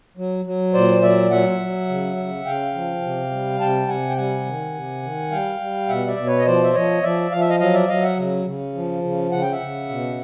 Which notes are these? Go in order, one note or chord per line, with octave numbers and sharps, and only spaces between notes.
F#3
F#3
A#2 C5 D5
F#3 D5 E5
F#3 E5 F#5
F#3
C#3
C#3
C#3 F5 G5
F3
C3
G3
C3 G5 A5
C3 F#5 G#5
G5
G3 F#5 G#5
D#3
C3
D#3
G3 F5 G5
G3
B2 E5 F#5
D5 E5
B2
B4 C#5
D#5
F3 C5 D5
E5
F3 C#5 D#5
F3 D5 E5
F3 F5
E5
D#5 F5
F#3 D#5 F5
D5 E5
F#3 D#5 F5
E5 F#5
C#3
C#3
F3
C#3
C#3 F#5
G5
E5 F#5
C#3
B2